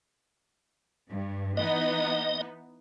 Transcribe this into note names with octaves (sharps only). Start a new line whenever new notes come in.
G2
E3 B3 D#4 D#5